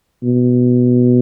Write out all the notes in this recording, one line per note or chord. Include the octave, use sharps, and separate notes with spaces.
B2